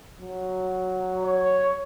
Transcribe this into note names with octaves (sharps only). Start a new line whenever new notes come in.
F#3
C#5